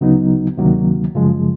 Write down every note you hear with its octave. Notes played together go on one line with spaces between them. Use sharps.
D2 C#3 F#3 B3 D#4
D2 C3 D#3 F#3 A#3
F#2 C#3 F3 G#3